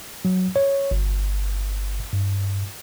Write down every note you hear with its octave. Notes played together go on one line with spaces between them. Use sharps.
F#3
C#5
G1
G2